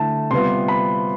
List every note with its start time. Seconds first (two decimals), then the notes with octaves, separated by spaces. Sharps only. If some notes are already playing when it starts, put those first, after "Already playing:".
Already playing: D3 A3 E4 A5
0.31 C3 G3 B3 F4 C6
0.68 B5